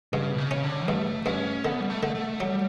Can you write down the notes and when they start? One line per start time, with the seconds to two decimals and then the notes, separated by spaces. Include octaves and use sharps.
0.13 G2 C#3
0.32 B2
0.38 C#3
0.51 C#4
0.63 D3
0.88 G2 A3
1.26 G2 C#4
1.65 D3 B3
1.80 G3
1.90 A3
2.03 D3
2.15 A3
2.40 F#3 G3